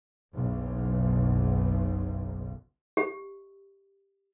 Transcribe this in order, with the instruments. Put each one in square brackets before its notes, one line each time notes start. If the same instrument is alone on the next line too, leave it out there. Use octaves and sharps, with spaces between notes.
[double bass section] F#1 B1
[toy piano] G4